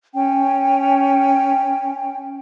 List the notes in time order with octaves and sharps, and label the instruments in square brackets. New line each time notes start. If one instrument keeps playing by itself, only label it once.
[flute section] C#4 G5